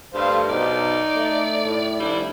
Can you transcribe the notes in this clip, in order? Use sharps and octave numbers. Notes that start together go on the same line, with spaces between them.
G2 A3 C5 F5
B1 D#4 D5
A3
A2
F1 G3 D4 E4